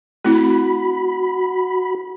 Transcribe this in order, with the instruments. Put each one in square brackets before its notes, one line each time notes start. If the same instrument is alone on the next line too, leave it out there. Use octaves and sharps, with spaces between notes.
[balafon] A3 C4 E4 [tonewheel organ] F#4 B5